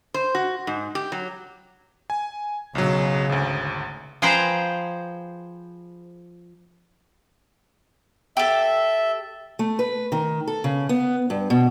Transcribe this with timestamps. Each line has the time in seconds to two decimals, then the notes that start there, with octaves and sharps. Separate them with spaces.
0.14 C5
0.35 F#4
0.67 G#2
0.95 G4
1.12 F#3
2.10 G#5
2.75 B1 C#3 F#3
3.29 G#1 D2
4.22 F3 G#4 B4 C5 G5 A#5
8.37 G4 A4 E5
9.59 A3
9.79 B4
10.12 D#3
10.47 A4
10.64 C#3
10.89 B3
11.30 G2
11.50 B2